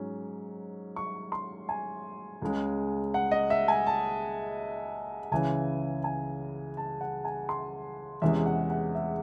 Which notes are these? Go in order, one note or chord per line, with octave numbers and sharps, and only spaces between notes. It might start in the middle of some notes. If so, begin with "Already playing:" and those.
Already playing: G#2 F#3 C#4
C#6
C6
G#5
C#2 C#3 G#3
F#5
D#5
E5
G#5
A5
C#2 C#3 E3 G#5
G#5
A5
F#5
G#5
C6
E2 C3 E3 G#3 C#4 E5
F#5
F#5
E5